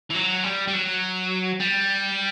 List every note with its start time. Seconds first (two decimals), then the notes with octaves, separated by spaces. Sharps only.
0.10 E3
0.15 F#3
0.43 G3
0.68 G3
0.73 F#3
1.60 G3